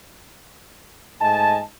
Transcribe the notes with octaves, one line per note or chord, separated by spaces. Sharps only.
G#2 A3 D#5 G#5 A5